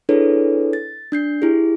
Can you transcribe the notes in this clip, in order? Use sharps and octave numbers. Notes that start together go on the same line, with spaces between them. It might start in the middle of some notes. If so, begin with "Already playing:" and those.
D4 E4 G#4 A4 B4 C#5
A6
D4 G6 C7
E4 G4 G#4